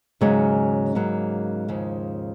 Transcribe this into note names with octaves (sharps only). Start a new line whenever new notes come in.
D#2 G#2 C#3 F#3 C#4
C#3 F#3 A#3
D#2 C#3 F3